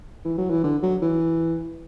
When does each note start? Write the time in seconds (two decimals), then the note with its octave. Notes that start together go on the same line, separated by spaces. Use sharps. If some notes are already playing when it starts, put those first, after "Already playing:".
0.25 E3
0.38 F#3
0.50 E3
0.64 D3
0.82 F#3
1.02 E3